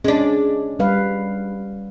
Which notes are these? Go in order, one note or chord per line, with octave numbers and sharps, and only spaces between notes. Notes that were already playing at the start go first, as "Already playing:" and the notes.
G#3 C#4 D4
G3 B4 F5